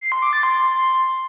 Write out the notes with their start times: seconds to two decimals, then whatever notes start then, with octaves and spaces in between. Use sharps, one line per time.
0.01 C7
0.12 C6
0.22 D6
0.33 A6
0.43 C6